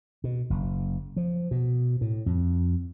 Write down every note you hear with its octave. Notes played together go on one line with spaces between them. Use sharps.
B2
F#1
F3
B2
A2
F2